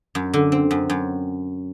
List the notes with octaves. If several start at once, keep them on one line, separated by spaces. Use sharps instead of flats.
F#2
D3
C4
F#2
F#2